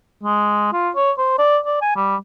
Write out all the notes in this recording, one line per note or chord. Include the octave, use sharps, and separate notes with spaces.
G#3
F4
C#5
C5
D5
D5
G#5
G3